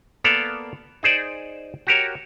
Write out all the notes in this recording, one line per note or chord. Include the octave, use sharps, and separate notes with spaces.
A#3 B3 A4 D5 F5
D#4 G#4 C5 D5
F#4 G4 A#4 C#5